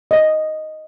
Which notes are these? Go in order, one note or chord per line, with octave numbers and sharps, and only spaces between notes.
D#5